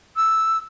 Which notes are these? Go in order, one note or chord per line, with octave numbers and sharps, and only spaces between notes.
E6